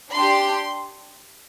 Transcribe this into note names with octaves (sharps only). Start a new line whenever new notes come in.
D4 G4 C6